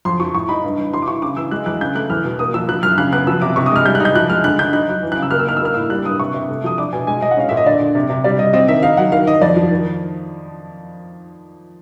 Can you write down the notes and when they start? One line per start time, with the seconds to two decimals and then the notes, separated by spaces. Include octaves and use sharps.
0.05 F2 C6
0.19 F3 C#6
0.35 A2 C#6
0.49 D#4 B5
0.64 G2
0.78 E3
0.93 E4 C6
1.02 D6
1.08 E4 C#6
1.22 C#3 D6
1.37 E3 E6
1.51 G#3 F#6
1.66 E2 F#6
1.80 C#3 G6
1.95 A3 F#6
2.10 E2 F6
2.24 B2
2.39 A#3 D#6
2.54 F3 E6
2.68 F3 F#6
2.83 F#2 F6
2.98 C#3 F#6
3.12 B3 F#6
3.27 F3 E6
3.42 C3 D6
3.56 C3 C#6
3.66 D#6
3.72 G#3 F6
3.85 G3 G6
3.95 F#6
4.00 D#4
4.05 G6
4.15 F3 F#6
4.29 G#3 F6
4.44 D3 F#6
4.59 D3 G6
4.73 D#4 F#6
4.88 F#3
5.03 E3
5.12 F#6
5.17 C#3
5.22 E6
5.31 A#3 F6
5.39 E6
5.47 D#4 F6
5.57 E6
5.61 A#3 F6
5.74 A2 E6
5.90 G3 F#6
6.05 G2 D#6
6.20 C3 C#6
6.34 C3
6.49 A3
6.64 F3 D#6
6.78 D4 D6
6.93 B2 G#5
7.07 G#3 G#5
7.22 G#3 D#5
7.31 F#5
7.37 C#4 F5
7.49 A#2 E5
7.57 D#5
7.66 D3 D5
7.81 D3
7.95 C3
8.10 C3
8.24 G3 D5
8.39 G3 D#5
8.53 C4 D#5
8.68 D#3 E5
8.83 D#4 F5
8.97 F#3 F#5
9.12 D#3 F5
9.27 D#3 D#5
9.41 F2 D5
9.56 F3
9.71 D#3